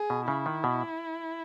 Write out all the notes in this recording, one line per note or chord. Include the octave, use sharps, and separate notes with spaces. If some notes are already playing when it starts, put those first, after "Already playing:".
Already playing: G#4
B2
C#3 E4
D#3
B2